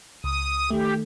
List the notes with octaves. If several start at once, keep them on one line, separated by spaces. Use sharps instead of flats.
C#2 D#6
D#3 A3 G4